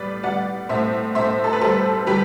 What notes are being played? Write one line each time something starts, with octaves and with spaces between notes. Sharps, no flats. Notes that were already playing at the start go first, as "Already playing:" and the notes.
Already playing: A2 G3 B4 D5
G3 D5 F#5
A2 C5 E5
A2 C5 E5
A4
B4
G3 A4 C5
G3 G4 B4